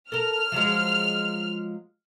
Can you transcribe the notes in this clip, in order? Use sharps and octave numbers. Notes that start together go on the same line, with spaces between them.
A4 A#4 F6
F3 F#3 G#3